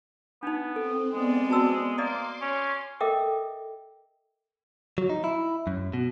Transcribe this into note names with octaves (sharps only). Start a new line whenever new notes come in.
B3 D4 D#4
C4 A4
G#3 B3 C4 D5
F#4 A5 E6
A#3 D5 D#5 C6 D6 D#6
C#4
A4 A#4 D#5 E5 G5 D6
F#3
D#4
E4
F#2
B2